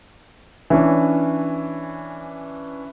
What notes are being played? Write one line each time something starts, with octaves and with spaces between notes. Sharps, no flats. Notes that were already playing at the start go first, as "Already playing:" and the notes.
E3 C#4 D4